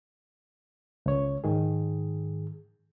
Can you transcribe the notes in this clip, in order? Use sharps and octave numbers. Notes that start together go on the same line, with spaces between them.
C#2 C#5
G#2 D#3 G#4